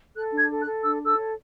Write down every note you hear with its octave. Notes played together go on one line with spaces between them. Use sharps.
A4 F#6
D4
G#6
A4
F#6
A4
D4 E6
A4
E6
C#5